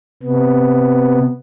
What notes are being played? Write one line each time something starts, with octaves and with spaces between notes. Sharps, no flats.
C3 B3